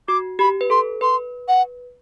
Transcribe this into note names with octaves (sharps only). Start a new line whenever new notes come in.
F#4 D6
G4 B5
B4
A4 C6
B4 C6
F#5